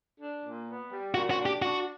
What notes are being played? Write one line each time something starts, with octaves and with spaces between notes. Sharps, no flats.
D4
A#2
B3
G3
A#2 F#4
F#4
D4
G4
D4 F#4